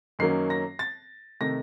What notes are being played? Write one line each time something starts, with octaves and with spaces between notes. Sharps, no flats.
F#2 D#3 F#3 A#3 C#4 C7
A#6
A6
C3 D#3 A3 A#6